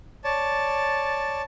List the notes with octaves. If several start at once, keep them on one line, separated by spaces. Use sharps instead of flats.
C#5 D5 A5